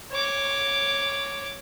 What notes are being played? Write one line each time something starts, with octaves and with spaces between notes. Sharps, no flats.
C#5 D6